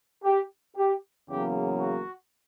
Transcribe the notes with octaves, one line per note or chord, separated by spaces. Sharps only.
G4
G4
E2 C#3 F#3 A#3 G4
F#4